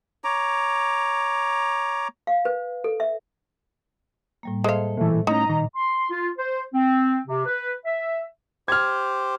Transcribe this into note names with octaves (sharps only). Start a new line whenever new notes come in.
C#5 A#5 D6
F5
B4
A4
E5
A2 G3 A#3
G#3 A4 C5 E5 F5 G#6
A#2 E3 A3
A2 C#4 D#4 D#5 A#5
A#2 D#3
C6
F4
C5
C4
C3
B4
E5
G4 C5 F6 G#6